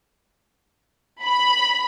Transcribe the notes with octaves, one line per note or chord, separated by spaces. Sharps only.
B5